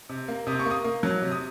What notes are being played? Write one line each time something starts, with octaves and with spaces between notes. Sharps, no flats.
C3
A#3
C3 D#6
C#6
A#3
D#6
A#3
F#3
C3
D#6